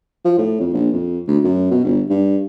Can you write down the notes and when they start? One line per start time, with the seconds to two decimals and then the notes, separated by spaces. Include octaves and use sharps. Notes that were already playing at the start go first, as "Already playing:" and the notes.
0.25 F3
0.38 A2
0.60 F2
0.74 A#1
0.93 F2
1.28 D2
1.44 F#2
1.71 B2
1.84 G1
2.10 G2